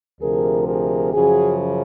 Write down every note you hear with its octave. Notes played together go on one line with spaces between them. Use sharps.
D2 C3 F3 G#4 A#4
G#4 A#4
F#2 C#3 F3 F#4 G#4